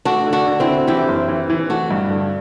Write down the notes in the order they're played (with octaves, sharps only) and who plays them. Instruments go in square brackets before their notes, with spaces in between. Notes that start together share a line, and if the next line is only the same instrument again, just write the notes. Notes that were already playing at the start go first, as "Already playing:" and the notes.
[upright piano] A3 [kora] D4 F#4
[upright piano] D3
[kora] D4 F#4
[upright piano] D3
[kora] C4 E4
[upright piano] D3
[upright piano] E3 [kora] E4 G4
[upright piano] F#1
E3
E3
[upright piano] A3 [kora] D4 F#4
[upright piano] G2
D3